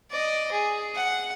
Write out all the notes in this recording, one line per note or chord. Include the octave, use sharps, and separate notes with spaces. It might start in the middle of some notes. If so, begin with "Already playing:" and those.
D5 D#5
G#4
F#5